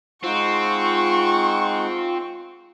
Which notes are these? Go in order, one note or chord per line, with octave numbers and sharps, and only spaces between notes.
G#3 C4 D#4 F4 F#5 C#6